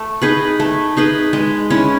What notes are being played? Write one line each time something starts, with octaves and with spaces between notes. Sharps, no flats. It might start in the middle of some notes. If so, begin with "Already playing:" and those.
Already playing: A3
D#4 G#4 B4
A3
D#4 G#4 B4
G#3
C#4 E4